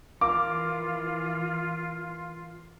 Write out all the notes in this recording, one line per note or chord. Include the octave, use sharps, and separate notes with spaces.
E3 F4 A#4 F5 D6